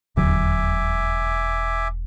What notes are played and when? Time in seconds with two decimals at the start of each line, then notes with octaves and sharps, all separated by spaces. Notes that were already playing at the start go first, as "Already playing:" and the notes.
0.17 E1 D#2 D3 F#3 E5 G#5 D6